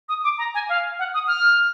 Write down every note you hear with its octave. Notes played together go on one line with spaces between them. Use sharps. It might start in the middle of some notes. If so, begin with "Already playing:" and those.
D#6
D6
A#5
G#5
F5
F#5
D#6
F6